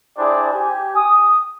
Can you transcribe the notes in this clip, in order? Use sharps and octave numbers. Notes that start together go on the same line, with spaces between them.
D4 E4 G4 G#4 C5 D5
G4 G#5
D#6